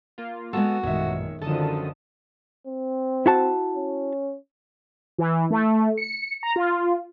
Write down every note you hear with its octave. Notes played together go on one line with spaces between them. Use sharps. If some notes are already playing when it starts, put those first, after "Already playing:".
A#3 F4
G#3 B3 F#4 A4
A1 F#2 A#2 D#3 G#3 C#5 E5
F#2 D3 D#3 F3 A4 A5 D#6
C4
E4 F#4 A5
C#4
E3
A3
C#7
A#5
F4